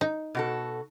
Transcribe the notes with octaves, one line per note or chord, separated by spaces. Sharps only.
D#4
B2 F#4 A4